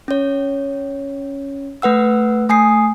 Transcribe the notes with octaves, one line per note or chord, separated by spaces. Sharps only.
C#4 C#5
A3 B4 F#5 E6
A3 G#5 D#6 C7